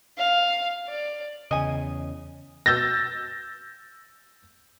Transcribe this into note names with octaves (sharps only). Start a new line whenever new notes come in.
F5
D5
E2 C#3 D#5 G#5
E6 G6 A6 A#6